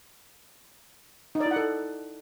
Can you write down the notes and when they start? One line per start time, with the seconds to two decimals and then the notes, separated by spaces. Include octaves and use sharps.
1.35 D#4
1.40 D5
1.46 E4
1.51 F#5
1.56 A4